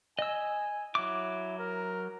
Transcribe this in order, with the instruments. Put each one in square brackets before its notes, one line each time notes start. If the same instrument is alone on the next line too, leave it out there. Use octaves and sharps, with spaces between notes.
[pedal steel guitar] D#5 E6 [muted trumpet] G#5
[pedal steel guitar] F#3 D6 [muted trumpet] E4
[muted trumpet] A#4